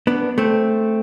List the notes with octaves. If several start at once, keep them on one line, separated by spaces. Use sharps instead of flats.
B3 D4
A3 C4